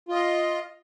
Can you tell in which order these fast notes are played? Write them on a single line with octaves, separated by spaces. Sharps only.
F4 D#5 F5